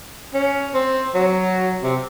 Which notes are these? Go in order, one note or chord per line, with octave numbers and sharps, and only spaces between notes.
C#4
C4
F#3
C3